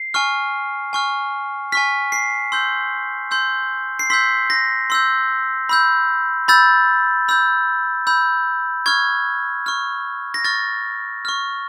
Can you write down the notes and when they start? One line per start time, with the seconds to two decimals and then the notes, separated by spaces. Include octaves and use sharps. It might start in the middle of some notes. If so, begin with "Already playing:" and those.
Already playing: C7
0.14 G#5 C#6 F6
0.93 G#5 C#6 F6
1.72 G#5 C#6 F6 B6
2.12 C7
2.52 C6 E6 G6
3.31 C6 E6 G6
3.99 C7
4.10 C6 E6 G6 B6
4.50 A#6
4.90 C6 E6 G6
5.69 B5 E6 G6
6.48 B5 E6 G6 A6
7.28 B5 E6 G6
8.07 B5 E6 G6
8.86 C#6 F6 G#6
9.66 C#6 F6
10.34 A#6
10.44 C#6 F6 A6
11.25 C#6 F6